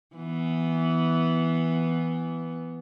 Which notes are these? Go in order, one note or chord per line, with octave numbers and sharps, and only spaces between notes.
E3 B3